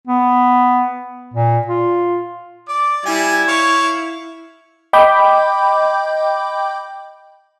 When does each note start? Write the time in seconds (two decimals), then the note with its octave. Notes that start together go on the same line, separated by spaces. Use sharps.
0.07 B3
1.34 A#2
1.67 F4
2.68 D5 D6
3.05 G3 E4 G#5 G#6
3.48 C#5 F5 C#6
4.93 D#5 G5 B5 D6 G6